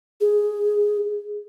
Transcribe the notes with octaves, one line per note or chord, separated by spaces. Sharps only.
G#4